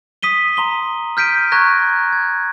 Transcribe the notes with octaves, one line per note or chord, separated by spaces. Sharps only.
D#6 B6 D#7 G7
A#5 C6 G7
F6 G6 B6 D7 D#7
A#5 C#6 F#6 G#6 A#6
G#6